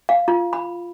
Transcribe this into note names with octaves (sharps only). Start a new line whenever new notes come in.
F5
F4
B5